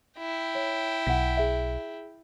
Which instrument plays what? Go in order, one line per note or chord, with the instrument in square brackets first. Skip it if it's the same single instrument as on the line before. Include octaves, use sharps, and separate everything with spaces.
[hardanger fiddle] E4 G5
[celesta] C#5
[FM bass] B1 [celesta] F#5 B6
[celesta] G#4 E5